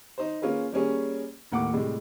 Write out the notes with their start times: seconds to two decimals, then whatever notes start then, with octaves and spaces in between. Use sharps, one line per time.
0.18 D#4 C5
0.42 A#3 C#4 F4 G#4 B4
0.72 G3 A#3 C#4 G#4
1.52 D#2 A2 A#3 F#5 D6
1.73 A2 C3 G3 G#3